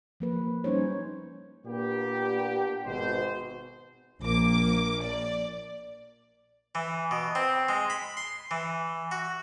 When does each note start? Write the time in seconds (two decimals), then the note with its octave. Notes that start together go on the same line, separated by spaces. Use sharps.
0.20 F3 A#3 B4
0.64 G3 C#4 D#4 C5 C#5
1.65 A#2 A#3 B3 D4 G4
2.85 G#1 B2 C5
4.22 A#1 A#3 D6
5.03 D5
6.75 E3
7.11 B2
7.35 C4
7.69 G#3
7.90 B5
8.17 C6
8.51 E3
9.11 F#4